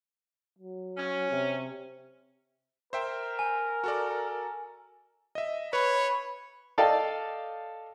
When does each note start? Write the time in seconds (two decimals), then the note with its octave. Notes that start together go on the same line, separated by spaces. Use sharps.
0.58 F#3
0.97 C#4
1.31 C3
2.93 A#4 C5 E5 G5
3.39 G#5
3.84 F#4 A4 D5
5.35 D#5 E5
5.73 B4 C#5 B5
6.78 A4 D5 D#5 F5 G5 A5